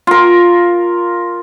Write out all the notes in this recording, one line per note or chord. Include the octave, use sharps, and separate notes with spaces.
F4 A#4